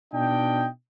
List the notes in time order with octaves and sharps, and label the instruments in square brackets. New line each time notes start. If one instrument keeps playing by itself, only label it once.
[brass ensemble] B2 D4 D#4 D#5 G5